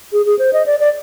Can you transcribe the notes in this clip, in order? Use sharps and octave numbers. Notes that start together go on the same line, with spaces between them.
G#4
G#4
C5
D#5
D5
D5